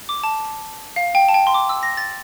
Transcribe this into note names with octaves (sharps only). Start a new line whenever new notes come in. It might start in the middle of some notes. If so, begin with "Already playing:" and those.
D6
A5
F5
G5
A5
G5
C6
D6
E6
A#6
A6